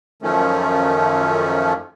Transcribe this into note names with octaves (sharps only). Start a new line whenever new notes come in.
F#2 D#3 F3 A3 C#4